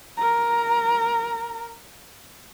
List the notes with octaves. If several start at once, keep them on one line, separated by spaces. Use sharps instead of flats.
A#4 A#5